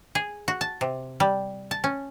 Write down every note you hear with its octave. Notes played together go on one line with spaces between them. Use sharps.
G#4
F#4
A5
C3
G3
A5
C#4